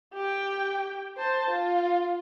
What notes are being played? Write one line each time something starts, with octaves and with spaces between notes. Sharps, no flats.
G4 G5
C5 A5
F4